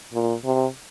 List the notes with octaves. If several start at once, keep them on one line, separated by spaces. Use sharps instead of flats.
A#2
C3